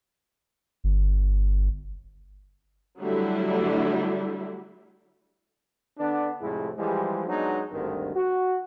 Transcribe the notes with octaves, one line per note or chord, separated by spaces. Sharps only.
G1
D3 F#3 G3 A3 D4 E4
D3 B3 D4
F2 A2 C3 G#3 E4
E3 F3 G3 G#3
F#3 G#3 B3 D4 D#4
G#1 D2 G2 D#3 C4
F#4